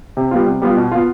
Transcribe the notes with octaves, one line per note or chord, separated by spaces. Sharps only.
C3
G3 B3 F4
C3
G3 B3 F4
B2
B3 F4